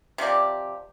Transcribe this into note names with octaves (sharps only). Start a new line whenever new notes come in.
C3 F3 G4 D5